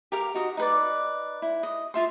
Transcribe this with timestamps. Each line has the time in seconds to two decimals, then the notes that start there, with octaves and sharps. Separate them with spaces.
0.12 G4 A#4 F5
0.34 D#4 F#4 D#5
0.57 D#4 B4 D5
1.42 E4
1.63 D#5
1.94 F4 E5 C6